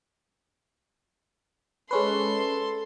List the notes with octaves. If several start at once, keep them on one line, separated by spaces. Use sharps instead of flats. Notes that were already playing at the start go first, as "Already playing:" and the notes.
G#3 C#4 A4 B4 C6